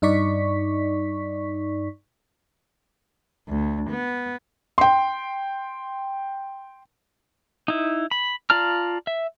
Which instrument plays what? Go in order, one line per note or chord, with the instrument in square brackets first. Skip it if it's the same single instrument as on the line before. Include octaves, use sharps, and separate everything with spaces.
[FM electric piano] G2 D#4 D5 C#6 B6
[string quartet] D2
B3
[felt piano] G5 C6
[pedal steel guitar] D#4 E4
B5
F4 D5 A5 A#5 F6
E5